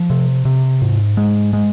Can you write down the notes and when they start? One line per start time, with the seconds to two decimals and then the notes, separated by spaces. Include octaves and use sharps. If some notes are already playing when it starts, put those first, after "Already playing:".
Already playing: F3
0.10 C3
0.45 C3
0.82 G#2
1.17 G#3
1.53 G#3